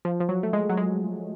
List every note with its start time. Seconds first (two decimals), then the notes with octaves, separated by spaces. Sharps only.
0.05 F3
0.20 F3
0.29 F#3
0.43 A3
0.53 G#3
0.69 F#3
0.77 G#3